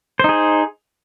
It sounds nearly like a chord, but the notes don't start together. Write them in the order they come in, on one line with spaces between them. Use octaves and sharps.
C5 D#4 G#4